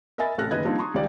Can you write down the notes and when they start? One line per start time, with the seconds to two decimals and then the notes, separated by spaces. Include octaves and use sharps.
0.18 A#4 D#5 E5 G#5 B5 A6
0.38 A1 C3 A4 F6 F#6 A#6
0.51 F#1 D#3 B4 D#5 F#6 G#6
0.64 F3 G3 A#3 C4 D4 D#4
0.78 A5 A#5 C6 C#6 D#6
0.94 C#2 D#3 G3 G4 D5 G5